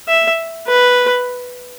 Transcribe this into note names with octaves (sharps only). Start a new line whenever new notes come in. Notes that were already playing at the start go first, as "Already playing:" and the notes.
E5
B4